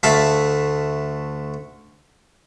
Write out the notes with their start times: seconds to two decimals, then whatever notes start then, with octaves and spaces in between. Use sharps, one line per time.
0.03 D2 A3 E5 F5 A5